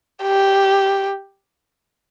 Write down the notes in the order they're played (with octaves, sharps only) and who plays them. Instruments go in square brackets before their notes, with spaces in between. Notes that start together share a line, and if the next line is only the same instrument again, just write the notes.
[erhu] G4